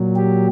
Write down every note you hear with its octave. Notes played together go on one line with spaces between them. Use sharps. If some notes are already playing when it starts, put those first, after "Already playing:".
Already playing: A#2 F#3
G4